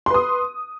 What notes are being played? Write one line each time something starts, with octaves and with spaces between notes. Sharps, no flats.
B4 C6 D#6